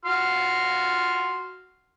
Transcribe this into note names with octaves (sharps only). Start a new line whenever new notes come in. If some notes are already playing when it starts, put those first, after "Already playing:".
F#4 C6 F6